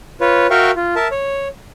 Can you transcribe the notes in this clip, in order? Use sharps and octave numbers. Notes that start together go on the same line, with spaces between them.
F4 B4 C#5
F#4 A#4 E5 F5 G5 C#6
F4
A#4 E5 A5
C#5